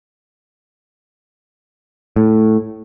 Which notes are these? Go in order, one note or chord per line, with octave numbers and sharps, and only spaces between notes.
A2